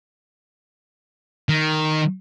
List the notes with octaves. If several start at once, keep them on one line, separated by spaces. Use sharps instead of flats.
D#3